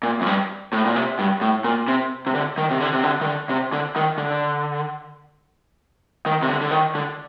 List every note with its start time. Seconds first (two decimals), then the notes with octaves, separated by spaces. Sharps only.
0.03 A#2
0.21 F2
0.26 G2
0.73 A2
0.85 A#2
0.96 C3
1.19 G2
1.41 A2
1.64 A#2
1.88 C3
2.27 C3
2.35 D3
2.58 D#3
2.71 C3
2.80 D3
2.93 C3
3.04 D3
3.21 D#3
3.26 D3
3.49 C3
3.73 D3
3.96 D#3
4.18 D3
6.26 D#3
6.43 C3
6.48 D3
6.61 D3
6.71 D#3
6.95 D3